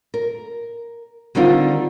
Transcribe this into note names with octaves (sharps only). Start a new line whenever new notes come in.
A#4
D3 D#3 G3 C4 D#4 F4